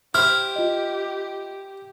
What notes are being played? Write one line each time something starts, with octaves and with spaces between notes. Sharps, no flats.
E4 G4 C5 F6
F4 D#5